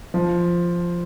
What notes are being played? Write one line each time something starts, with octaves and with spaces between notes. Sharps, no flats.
F3